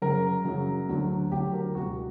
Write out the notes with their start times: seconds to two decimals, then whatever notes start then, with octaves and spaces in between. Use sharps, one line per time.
0.02 F#2 C#3 F#3 A#4
0.45 F#2 C#3 F#3
0.89 D2 D3 F#3
1.32 D2 D3 F#3 G4
1.53 A#4
1.75 C#2 B2 G3 F#4